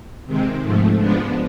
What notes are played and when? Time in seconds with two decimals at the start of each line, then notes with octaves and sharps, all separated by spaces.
0.26 C3 D#3 G#3 C4
0.62 G#2 F3 A3
0.98 F3 G#3 B3 D4